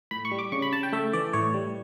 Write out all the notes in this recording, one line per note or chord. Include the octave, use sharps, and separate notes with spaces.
A2 B5
C#6
G3
D6
C#3 C#6
B5
C#3 A5
G5
A3 E5
E3 D5
A2 C#5
G3